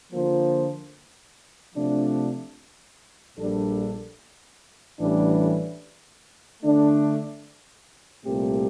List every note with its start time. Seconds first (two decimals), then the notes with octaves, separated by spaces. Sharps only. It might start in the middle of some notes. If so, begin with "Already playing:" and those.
0.12 D3 F3 A#3 F4 C5
1.75 C3 F3 A3 D4
3.37 A#1 A#2 G3 D4 A4
5.00 A1 A2 E3 G3 D4
6.63 D3 A3 D4
8.25 C2 A#2 A3 C4 G4